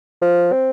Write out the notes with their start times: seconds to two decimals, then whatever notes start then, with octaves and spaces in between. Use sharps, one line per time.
0.22 F3
0.52 C4